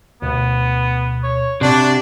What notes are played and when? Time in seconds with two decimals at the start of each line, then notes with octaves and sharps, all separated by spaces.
0.22 D2 B2 B3
1.23 C#5
1.61 C3 D4 F#4 G4